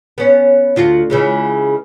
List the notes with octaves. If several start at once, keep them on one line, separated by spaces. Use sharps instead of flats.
B3 C#4
D2 F4 F#4
C#3 E3 G#3